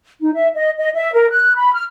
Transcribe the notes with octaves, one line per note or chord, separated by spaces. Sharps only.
D#4
E5
D#5
D#5
E5
A#4
F#6
B5
F6